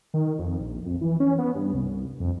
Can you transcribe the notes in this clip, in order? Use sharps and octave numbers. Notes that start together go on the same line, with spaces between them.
D#3
F2
A#1
F2
E3
C#4
B3
G2
C2
F2